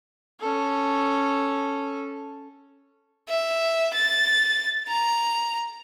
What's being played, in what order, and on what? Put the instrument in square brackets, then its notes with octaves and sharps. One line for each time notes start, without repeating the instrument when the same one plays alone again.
[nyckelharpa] C#4 A4
[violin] E5
A6
A#5